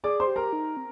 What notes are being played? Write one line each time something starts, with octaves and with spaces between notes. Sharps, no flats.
G#4 D5 D6
C5 C6
G4
A#4 A#5
D#4
C4